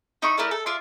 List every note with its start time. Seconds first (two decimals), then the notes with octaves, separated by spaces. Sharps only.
0.22 D#4 E4 B5 C#6
0.37 A3 E4 A#4 D5
0.51 A4
0.66 F4 D5 E5 C6